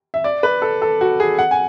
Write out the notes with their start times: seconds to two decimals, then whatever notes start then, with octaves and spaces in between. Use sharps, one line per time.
0.14 E5
0.24 D5
0.43 B4
0.62 A4
0.82 A4
1.01 F#4
1.20 G#4
1.39 F#5
1.51 G#5